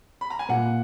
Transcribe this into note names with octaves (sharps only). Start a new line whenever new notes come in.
B5
A#5
G#5
A#2 F#5